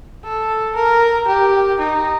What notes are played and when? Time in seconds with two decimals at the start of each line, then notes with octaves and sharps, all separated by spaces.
0.24 A4
0.75 A#4
1.27 G4
1.79 D#4